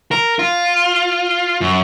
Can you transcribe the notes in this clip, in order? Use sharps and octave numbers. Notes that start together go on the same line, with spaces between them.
A#4
F4
F#2